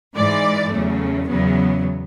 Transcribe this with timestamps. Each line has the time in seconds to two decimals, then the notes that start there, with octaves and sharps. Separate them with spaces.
0.16 G#2 E3 G#3 D5
0.72 E2 C#3 F#3 A3
1.28 E2 C#3 F#3 B3